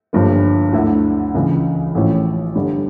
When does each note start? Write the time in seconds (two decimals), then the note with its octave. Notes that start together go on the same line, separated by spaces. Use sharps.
0.13 G1 G2 F3 A#3
0.73 D2 D3 A3 E4
1.35 C#2 C#3 E3
1.95 A1 A2 F3 C#4 E4
2.55 G1 G2 D3 G3